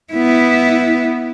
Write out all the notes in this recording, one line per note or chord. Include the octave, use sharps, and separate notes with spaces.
B3 E4